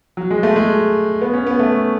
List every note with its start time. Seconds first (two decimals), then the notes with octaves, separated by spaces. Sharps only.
0.17 F#3
0.31 G#3
0.43 A3
0.56 G#3
1.22 B3
1.34 C#4
1.47 B3
1.59 A3